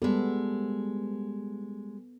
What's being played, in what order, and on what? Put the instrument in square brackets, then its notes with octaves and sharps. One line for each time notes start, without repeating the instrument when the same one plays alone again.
[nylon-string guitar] G3 G#3 [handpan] B3 A4